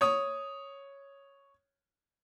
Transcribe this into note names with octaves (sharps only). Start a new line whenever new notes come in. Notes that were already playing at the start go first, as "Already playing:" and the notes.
C#5 D#6